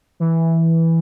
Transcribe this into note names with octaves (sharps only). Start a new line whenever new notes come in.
E3